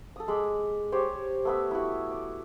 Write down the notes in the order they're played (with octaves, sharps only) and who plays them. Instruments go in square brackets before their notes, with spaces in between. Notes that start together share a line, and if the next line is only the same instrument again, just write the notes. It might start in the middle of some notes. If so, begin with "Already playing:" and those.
[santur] A4 D#6
G#3 B5 D6
G4 C5 C#5
A3 B3 E5
E4 F#4
D6